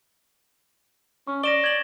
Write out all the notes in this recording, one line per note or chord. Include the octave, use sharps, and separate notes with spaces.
C#4 C#6
D5 A#6 E7 G7
G#6 A6 F#7